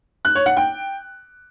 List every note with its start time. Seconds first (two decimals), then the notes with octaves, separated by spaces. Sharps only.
0.25 F#6
0.35 C#5
0.46 F#5
0.57 G5